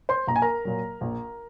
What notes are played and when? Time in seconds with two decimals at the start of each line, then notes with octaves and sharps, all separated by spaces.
0.09 C5 C6
0.27 A#1 A#5
0.36 G#5
0.42 A#4 A#5
0.65 A#2 F#3
1.01 A#1